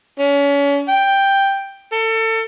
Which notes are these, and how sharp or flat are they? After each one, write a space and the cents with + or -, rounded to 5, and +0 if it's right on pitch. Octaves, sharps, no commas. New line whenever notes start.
C#4 +35
G5 +5
A4 +30